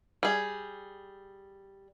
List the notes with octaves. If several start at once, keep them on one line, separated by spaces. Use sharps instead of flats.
G3 G#4